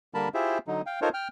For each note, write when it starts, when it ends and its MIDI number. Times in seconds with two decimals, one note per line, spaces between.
0.14 0.29 50
0.14 0.29 55
0.14 0.29 58
0.14 0.29 70
0.14 0.29 81
0.14 0.29 83
0.34 0.58 64
0.34 0.58 65
0.34 0.58 67
0.34 0.58 68
0.34 0.58 72
0.34 0.58 76
0.67 0.82 50
0.67 0.82 54
0.67 0.82 63
0.86 1.00 77
0.86 1.00 79
1.02 1.09 63
1.02 1.09 65
1.02 1.09 69
1.02 1.09 70
1.02 1.09 72
1.02 1.09 73
1.14 1.28 79
1.14 1.28 89